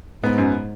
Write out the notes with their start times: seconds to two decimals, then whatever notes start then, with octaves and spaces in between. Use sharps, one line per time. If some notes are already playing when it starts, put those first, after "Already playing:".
0.24 G#2 B3
0.38 F#2